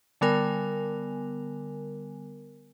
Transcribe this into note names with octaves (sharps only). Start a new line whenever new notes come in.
D3 G3 B3 A#4 G#5